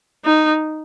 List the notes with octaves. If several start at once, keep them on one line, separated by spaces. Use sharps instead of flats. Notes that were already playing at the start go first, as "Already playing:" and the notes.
D#4